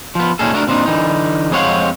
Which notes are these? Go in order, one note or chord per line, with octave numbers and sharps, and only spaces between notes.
F3 B3
A#2 C#4 D#4 G#4 A4
A3 D4 F#4 A#4
A#2 C4 D4 D#4
D3 E3 D#4
F2 G#3 C4 C#5 F5 F#5